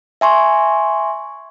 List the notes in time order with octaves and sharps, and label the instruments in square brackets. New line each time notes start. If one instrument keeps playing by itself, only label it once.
[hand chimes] E5 G#5 C6 C#6